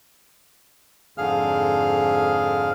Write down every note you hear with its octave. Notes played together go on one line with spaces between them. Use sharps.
F2 G#2 D3 G#4 F5 F6